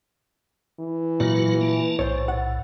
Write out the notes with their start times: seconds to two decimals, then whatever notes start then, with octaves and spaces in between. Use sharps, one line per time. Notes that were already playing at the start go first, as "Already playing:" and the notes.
0.80 E3
1.20 A#2 F#3 F4 F#4
1.61 A#3 A5
1.99 B1 A2 C5 C#5
2.28 F#5